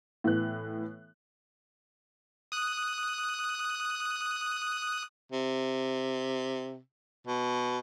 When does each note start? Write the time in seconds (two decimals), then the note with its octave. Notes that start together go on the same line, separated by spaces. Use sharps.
0.24 A2 E3 B3 F#6
2.52 D#6 F#6
5.32 C3
7.27 B2